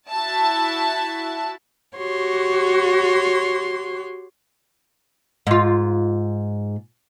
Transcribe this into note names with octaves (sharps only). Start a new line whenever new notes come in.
E4 F#4 E5 A5
F#4 G4 C#5 C6
G#2 F4